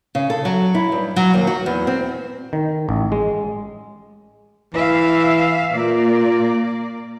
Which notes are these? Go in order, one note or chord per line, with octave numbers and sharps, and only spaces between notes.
C#3
A4
F#3
E4
G2
F#3
D#2
F#4
E2
C4
D#3
A1
G#3
E3 E5 F5
A#2 A#3 D5